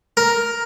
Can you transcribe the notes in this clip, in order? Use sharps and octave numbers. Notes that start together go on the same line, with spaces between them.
A#4